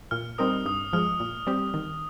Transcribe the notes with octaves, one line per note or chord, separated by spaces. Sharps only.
A#2 F6
G3 C4 D#4 A#4 D#6
G2 D#6
F3 G#3 F6
A#2
G3 C4 G4
D#3